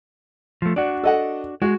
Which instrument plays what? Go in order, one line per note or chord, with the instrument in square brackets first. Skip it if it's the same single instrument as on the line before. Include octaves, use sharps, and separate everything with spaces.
[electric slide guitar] F3 A3
[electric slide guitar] D4 F#4 [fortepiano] D5
[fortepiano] A4 D#5 F#5
[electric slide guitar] G#3 [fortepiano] F#4